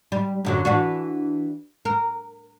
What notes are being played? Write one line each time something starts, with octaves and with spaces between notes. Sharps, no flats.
G3
F#2 D3 F#3
E3 D4 F#4
A#4